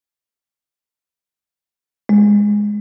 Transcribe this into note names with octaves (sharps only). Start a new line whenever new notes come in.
G#3